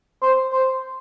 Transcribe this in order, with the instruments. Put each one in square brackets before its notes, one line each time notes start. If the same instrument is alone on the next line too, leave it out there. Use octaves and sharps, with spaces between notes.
[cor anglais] C5
C5